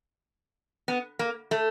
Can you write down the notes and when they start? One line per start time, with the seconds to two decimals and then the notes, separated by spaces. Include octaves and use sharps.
0.88 B3
1.19 A#3
1.51 A3